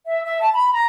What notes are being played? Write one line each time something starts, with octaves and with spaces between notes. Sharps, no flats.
E5
E5
A5
B5
A#5